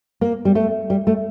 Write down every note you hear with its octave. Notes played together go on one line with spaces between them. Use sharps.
A#3
G3
A3
G3
A3